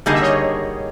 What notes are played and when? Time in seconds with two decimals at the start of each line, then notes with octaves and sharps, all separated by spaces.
0.06 D3 G3 A#3 D#4 G#4 D#5
0.14 E5
0.22 C#5 D#5